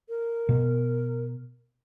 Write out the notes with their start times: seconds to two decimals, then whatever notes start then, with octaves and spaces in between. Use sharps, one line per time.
0.09 A#4
0.49 B2 B3